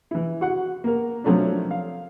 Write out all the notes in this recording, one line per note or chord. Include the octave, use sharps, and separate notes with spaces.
E3 E4
F#4 F#5
A#3 A#4
C3 F3 F#3 A3 C#4 D4
F5